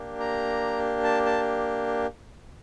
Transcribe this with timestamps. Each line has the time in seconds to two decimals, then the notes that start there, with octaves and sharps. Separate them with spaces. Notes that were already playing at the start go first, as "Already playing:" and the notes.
Already playing: A#3 D4 G4
0.20 A#5
1.04 A5
1.26 A5